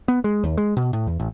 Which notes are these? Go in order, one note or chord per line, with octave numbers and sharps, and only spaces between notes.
B3
G#3
D#2
G#3
B2
A2
E2
A1